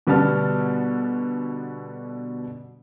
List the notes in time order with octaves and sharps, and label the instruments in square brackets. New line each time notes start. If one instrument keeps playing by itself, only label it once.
[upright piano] B2 D3 G3 B3 A5 F6